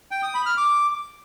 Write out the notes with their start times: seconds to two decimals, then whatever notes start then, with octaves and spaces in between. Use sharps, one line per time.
0.11 G5
0.23 D#6
0.34 B5
0.46 F6
0.57 D6